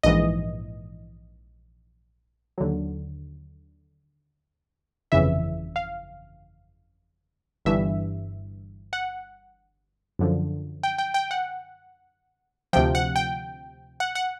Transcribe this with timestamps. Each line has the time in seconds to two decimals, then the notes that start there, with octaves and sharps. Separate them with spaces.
0.03 A#1 G#2 E3 D#5
2.58 D#2 D3 F#3
5.12 G1 F2 C#3 E3 E5
5.76 F5
7.65 G1 G2 E3 E5
8.93 F#5
10.19 F#2 D3 F3
10.83 G5
10.98 G5
11.14 G5
11.31 F#5
12.73 D2 C3 F3 G5
12.95 F#5
13.16 G5
14.00 F#5
14.15 F#5